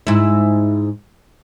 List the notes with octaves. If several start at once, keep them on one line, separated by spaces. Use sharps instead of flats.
G#2 E4